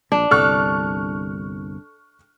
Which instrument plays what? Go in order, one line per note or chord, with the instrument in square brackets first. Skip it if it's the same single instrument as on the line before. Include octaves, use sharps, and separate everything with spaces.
[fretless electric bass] A#1 [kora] D4
[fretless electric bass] G1 C2 [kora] A4 [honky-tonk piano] C#6 F6 F#6